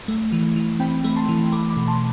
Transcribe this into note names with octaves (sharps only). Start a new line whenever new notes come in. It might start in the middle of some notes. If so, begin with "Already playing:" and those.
A3
E3
E3
C4 G5 B5
A3 B5
A5 C6
E3
A3 B5 D6
B5 D6
B2
A5 C6